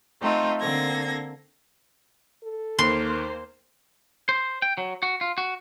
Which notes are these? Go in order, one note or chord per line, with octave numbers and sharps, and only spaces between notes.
A3 C4 D#4 F4
D3 A#3 C4 A4 G#6 A#6
A4
D#2 A#3 C5 C6
C5
G5
F#3
F#4
F4
F#4